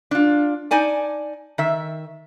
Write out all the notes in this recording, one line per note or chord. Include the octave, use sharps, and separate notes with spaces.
D4 F4
D#4 D5 G#5 A5
D#3 E5